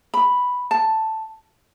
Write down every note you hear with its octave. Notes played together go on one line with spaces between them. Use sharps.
B5
A5